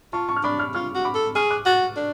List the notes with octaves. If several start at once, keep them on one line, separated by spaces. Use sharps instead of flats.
F4 A5 C#6
A5 C#6
F6
D4 B5 D6
C#6 F6
F4 C#6 F6
F#4
B5 D6
A4
G#4 C#6 F6
D6 F#6
F#4 F#6 A6
D4